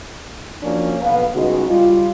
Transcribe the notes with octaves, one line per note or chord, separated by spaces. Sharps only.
F3 A#3 C#4 D4 F#4 C#5
B1 B3 B4 F5
C#2 G3 G#3 B3 D#4 F#4
G3 F4